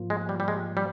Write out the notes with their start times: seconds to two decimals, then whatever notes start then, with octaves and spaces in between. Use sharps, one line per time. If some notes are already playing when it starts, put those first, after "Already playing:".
Already playing: G#2 F3 A#3 F4
0.10 G#3
0.29 G3
0.40 G3
0.48 G#3
0.77 G3